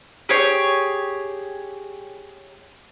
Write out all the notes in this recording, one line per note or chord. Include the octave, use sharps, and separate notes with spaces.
G4 G#4 C#5